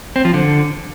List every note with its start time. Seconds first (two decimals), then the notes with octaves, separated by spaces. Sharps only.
0.16 C4
0.25 F3
0.34 D3